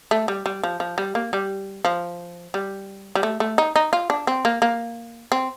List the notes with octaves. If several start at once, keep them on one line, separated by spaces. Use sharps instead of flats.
A3
G3
G3
F3
F3
G3
A#3
G3
F3
G3
G3
A3
A3
D#4
D#4
F4
D4
C4
A#3
A#3
C4